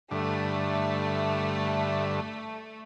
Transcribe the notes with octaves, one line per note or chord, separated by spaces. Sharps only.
G2 D3 A3